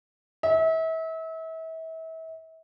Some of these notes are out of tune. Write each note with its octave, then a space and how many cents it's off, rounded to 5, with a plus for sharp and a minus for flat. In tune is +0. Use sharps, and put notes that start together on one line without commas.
E5 -35